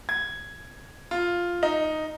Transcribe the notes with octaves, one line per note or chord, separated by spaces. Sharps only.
G#6
F4
D#4